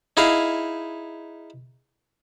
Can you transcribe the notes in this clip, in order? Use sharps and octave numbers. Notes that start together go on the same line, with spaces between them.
D#4 E4 G#4 F5